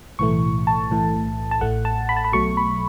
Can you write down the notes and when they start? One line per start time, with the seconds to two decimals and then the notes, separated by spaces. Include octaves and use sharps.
0.19 B1 A2 E3 A3 C#6
0.67 A5
0.90 B1 A2 E3 A3
1.51 A5
1.61 A1 A2 A3 F#5
1.85 A5
2.09 B5
2.16 A5
2.24 B5
2.33 B1 B2 F#3 A3 C#6
2.57 B5